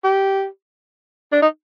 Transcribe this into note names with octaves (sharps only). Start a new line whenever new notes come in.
G4
D4
D#4